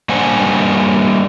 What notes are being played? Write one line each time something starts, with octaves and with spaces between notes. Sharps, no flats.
G3 A#3 D4 C5 F#5 G#5